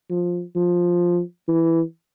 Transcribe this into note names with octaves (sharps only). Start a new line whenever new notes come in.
F3
F3
E3